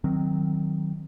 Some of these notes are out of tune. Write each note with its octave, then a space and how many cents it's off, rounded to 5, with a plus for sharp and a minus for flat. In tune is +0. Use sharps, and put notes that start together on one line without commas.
D#3 -5 F#3 +0 C4 +0